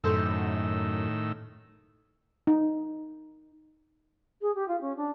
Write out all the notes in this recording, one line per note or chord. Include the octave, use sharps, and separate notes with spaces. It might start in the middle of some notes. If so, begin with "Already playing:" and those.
F#2 A2 D#3 A4 C5 E6
D#4
G#4
G4
F4
C#4
D4